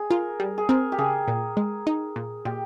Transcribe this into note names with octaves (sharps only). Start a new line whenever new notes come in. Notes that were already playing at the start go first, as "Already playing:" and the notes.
Already playing: G#4
F4 A#4
G3
G#4
C4 A#4
G4
C#3 G#4
A#2
G#3
D#4
A#2
A#2 G4